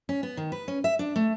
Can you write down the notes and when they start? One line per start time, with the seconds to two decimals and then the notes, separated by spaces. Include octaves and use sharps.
0.09 C#4
0.23 B3
0.37 D#3
0.52 B4
0.68 C#4
0.84 E5
0.99 D4
1.16 A3